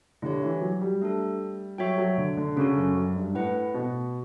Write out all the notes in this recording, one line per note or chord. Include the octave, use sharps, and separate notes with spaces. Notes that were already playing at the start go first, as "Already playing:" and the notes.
D3 E4 G4 C#5
E3
F#3
G3
A3 D4 A4
F#3 F#4 C#5 E5 G5
F#3
D3
D3
C#3 C#4 F#4 A4
F#2
F#2
G2
A2 E4 B4 F#5
B2